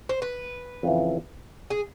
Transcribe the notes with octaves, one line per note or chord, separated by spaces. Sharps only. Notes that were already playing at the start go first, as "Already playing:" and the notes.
C5
B4
F2 C#3 E3
G#4